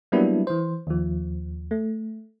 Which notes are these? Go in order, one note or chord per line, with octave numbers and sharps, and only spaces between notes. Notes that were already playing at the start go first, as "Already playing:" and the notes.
F#3 G3 A#3 B3 D4 E4
E3 C5
D#2 F3
A3